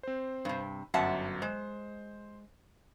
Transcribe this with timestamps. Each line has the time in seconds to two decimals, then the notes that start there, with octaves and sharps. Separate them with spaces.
0.03 C4 C5
0.45 G2 C3
0.94 G1 F#2 F#3 E5 F#5 A5
1.42 G#3 C5